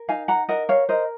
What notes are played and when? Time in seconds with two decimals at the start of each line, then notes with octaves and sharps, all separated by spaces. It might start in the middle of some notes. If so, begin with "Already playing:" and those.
Already playing: A#4
0.08 D#4 F5 G#5
0.28 F#5 A#5
0.49 A#4 D#5 F#5
0.69 C#5 F5
0.89 A#4 C5 D#5